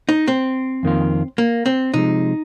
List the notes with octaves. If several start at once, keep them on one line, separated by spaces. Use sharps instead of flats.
D#4
C4
F2 D#3 A#3 F4
A#3
C4
C3 F3 G#3 D#4